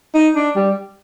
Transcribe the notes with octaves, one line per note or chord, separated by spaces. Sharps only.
D#4
D4
G3